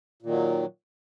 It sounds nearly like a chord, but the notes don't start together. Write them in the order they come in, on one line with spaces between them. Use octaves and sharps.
A#2 D#3 F#3